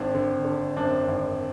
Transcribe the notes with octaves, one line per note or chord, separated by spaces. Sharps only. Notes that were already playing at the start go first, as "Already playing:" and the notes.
Already playing: G#1 C4 D4
D3
D3
F#2 C4 D4
G#1